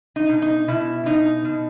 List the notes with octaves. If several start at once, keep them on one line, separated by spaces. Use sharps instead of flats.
D#4
B2
D#4
B2 E4
B2 D#4
B2